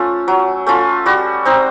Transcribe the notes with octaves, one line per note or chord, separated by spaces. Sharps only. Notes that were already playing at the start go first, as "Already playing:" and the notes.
Already playing: A3 C#4 F4
F#3
A3 C#4 F4
G3 F#4
C4 D#4